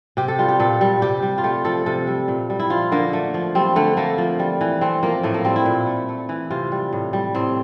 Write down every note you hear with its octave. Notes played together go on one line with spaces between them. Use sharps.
C3 G4
A4
G3 F4
G4
A#2 A4
G3
C3 G4
G3
F4
A3 G4
F3 A4
C3 A4
G3
A#2
G3
E4
F3 F4
D3 A#3
A3
F3
G3 C4
D3 A3
A3 A#3
F3
G3
E3
A3 C4
F3 A#3
A2 A3
A#3
G3 C4
E4
A#2
A3
A3
E3
C3 F4
G3
A2
G3
A2 C4